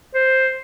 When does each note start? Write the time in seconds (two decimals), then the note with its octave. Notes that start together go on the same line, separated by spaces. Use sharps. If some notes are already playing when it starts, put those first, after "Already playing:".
0.14 C5